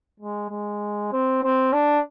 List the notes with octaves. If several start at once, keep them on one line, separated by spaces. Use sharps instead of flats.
G#3
G#3
C4
C4
D4